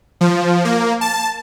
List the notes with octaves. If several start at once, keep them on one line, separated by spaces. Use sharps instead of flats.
F3
A#3
A5